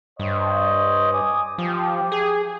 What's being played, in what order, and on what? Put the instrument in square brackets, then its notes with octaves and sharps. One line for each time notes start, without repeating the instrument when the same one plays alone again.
[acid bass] G2 [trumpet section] C5 C#5 D#5
[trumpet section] G#5 D6 D#6
[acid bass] F3 [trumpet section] G4
[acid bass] G#4